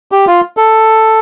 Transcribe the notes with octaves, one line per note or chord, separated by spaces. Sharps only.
G4
F4
A4